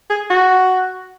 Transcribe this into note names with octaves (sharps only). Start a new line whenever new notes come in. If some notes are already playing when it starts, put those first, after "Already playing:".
G#4
F#4